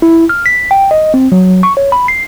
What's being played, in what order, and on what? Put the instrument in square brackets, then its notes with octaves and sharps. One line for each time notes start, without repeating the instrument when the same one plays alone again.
[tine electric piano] E4
F6
B6
G5
D#5
C4
F#3
C#6
C#5
B5
C7